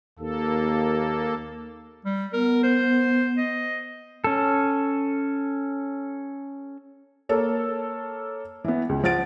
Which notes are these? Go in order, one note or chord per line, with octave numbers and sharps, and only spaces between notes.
D#2 A#3 A4
G3
B3 A#4
C5
D#5
C#4 A4
A#3 A4 C#5
E3 B3
C#2
F3 F#5 A6 D7